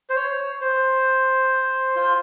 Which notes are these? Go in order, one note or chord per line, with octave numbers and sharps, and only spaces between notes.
C5
C#5
C5
F4